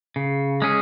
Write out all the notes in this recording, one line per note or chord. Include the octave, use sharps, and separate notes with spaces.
C#3
G#3 C#4 G#4